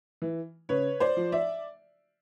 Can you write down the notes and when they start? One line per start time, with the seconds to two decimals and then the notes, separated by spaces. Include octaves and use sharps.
0.22 E3
0.69 C#3 B4 C#5
1.00 C5 D5
1.17 F3
1.32 D5 E5